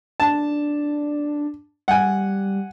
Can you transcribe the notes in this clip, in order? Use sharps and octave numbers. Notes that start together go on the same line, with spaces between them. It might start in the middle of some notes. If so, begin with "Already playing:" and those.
D4 A5
G3 F#5 G#5